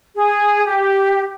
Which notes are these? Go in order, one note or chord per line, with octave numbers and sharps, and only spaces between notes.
G#4
G4